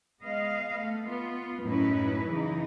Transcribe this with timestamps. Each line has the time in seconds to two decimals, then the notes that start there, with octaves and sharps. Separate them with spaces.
0.22 G#3 B3 D#5 F5
0.78 A3
1.07 B3 F4
1.63 F#2 A2 C#4 D#4 E4 B4
2.27 C#3 E3 D#4